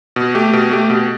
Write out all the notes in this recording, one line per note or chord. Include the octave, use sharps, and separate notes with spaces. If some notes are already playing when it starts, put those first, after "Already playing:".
B2
A3 G4
B2
A3 G4
B2